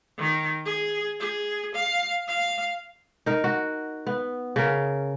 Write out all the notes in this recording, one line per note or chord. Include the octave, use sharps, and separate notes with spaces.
D#3
G#4
G#4
F5
F5
D#4 A#4
F#4
B3
C#3 A#4